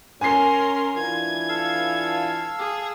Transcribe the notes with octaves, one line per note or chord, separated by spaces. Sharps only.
C#4 A#4 G#5 C6 C7
E3 D4 F4 G#6
A4 F5 E6
G#4